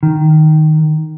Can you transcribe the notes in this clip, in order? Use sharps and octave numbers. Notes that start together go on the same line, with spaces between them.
D#3